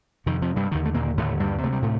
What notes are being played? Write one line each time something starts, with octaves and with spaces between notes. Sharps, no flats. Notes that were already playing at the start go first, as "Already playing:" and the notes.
F2 C3 D#3
F2 F3
G2 G3
D#2 D3 D#3
A3
A#2 A#3
D#2 A2 D3 A3
G2 G3
D2 C3 A3
G3
A2 A3